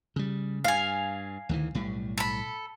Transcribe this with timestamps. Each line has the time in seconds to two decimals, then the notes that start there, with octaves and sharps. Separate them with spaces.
0.16 C#3 G3
0.64 G2 F5 G#5
1.49 D2 D#3 E3
1.75 B1 A2 G3
2.18 A4 B5